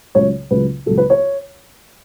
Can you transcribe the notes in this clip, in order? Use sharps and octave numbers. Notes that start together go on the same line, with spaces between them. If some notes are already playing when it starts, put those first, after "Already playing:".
C#2 C#3 F#3 C#5
C#2 C#3 F#3 B4
C#2 C#3 F#3 A4
B4
C#5